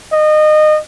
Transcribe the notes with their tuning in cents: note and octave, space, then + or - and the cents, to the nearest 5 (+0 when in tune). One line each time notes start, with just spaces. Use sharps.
D#5 -25